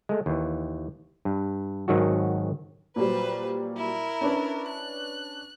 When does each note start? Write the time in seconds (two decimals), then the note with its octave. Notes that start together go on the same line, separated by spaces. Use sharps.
0.09 G#3 A3
0.26 D#2 E3
1.25 G2
1.88 G#1 D#3 F#3 F#4
2.96 A#2 F#3 G3 B4 C5
3.77 E4 A#4
4.21 C#4 D4 B4
4.68 F#6